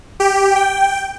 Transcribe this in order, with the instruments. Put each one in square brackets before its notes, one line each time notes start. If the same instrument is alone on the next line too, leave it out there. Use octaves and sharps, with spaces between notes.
[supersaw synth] G4
G5